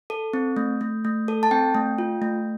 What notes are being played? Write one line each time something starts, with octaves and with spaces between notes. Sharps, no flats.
A4
C4
A3
A3
A3
A4
A5
C4 G5
A3
F4
A3